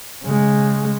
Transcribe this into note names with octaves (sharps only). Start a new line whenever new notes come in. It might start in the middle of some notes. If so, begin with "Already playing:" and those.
C#3 G#3